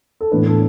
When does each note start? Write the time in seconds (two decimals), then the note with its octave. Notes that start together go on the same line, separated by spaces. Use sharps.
0.21 A4
0.31 A2 E3 B3 D4 B4
0.47 A4